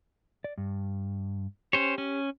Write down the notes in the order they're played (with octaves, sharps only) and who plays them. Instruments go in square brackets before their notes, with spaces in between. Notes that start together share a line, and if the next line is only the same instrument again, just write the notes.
[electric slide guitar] D5
G2
[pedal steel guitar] C#4 C5 C#5 [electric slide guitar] G4
[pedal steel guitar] C#4